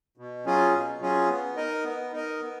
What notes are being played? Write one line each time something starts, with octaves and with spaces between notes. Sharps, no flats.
B2
F#3 C#4 F4 G#4
B2
F#3 C#4 F4 G#4
B3
D#4 A#4 D#5
B3
D#4 A#4 D#5
B3